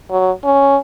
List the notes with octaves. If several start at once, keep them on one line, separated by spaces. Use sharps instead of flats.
F#3
C#4